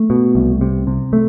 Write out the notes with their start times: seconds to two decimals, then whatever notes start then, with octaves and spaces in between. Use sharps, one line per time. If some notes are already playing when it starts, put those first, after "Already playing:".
Already playing: A3
0.10 B2
0.35 C2
0.61 C3
0.87 C3
1.13 A3